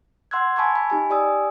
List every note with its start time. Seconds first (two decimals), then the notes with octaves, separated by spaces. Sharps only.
0.31 F#5 C6 E6 F#6 G#6
0.56 G#5 A5 B5 C#6 E6 G#6
0.76 B5
0.90 D#4 G4 G#5
1.10 G4 D5 G#5 D#6 E6